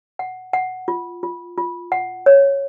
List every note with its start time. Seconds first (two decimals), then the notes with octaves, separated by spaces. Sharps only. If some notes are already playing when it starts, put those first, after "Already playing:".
0.19 F#5
0.53 F#5
0.88 F4
1.23 F4
1.58 F4
1.92 F#5
2.26 C#5